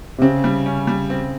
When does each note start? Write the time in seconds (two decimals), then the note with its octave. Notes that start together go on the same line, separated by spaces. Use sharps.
0.18 C3
0.22 C#3 C4
0.44 G3
0.66 C#4
0.87 G3
1.10 C4